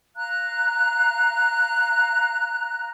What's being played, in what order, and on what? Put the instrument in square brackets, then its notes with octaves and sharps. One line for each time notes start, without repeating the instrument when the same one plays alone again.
[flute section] F5 A#5 F#6